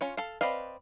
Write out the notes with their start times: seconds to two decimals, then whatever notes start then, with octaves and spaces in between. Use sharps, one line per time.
0.01 C#4 F4 C#5
0.17 A4 F5
0.41 C4 B4 D5 D#5 F5